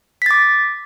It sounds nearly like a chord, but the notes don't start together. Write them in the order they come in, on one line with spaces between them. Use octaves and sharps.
B6 A6 D6